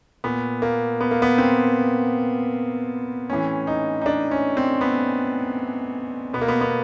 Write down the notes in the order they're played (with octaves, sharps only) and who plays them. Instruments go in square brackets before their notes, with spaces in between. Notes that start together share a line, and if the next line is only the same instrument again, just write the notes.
[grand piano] A#2 B3
A#3
B3
A#3
B3
C4
A2 E3 C#4
D#4
D#4
D4
C#4
C4
B3
B2 B3
A#3
B3
B3